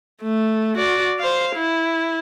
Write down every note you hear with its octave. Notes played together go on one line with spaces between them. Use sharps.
A3
F#4 D5
C5 F5
E4